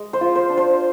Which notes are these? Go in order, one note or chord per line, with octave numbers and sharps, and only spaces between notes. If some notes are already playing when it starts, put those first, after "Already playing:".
Already playing: G#3
C5
F4
C5
D4
C5